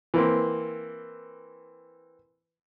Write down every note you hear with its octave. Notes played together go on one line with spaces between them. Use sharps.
E3 A#3 C4